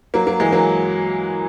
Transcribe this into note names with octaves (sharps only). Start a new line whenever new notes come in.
F#3 A#3
F#3 A#3
E3 G#3
F#3 A#3